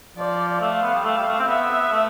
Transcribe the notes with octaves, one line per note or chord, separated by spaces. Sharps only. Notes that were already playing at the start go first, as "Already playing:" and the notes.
F3 D5
A3 F5
B3
G3
A3 F5
G3
A3
C4
B3 E5
A3